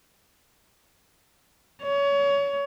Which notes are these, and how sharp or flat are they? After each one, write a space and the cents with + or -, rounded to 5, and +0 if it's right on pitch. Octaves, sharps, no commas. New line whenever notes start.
C#5 +25